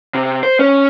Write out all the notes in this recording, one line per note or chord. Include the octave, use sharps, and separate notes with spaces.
C3
C5
C#4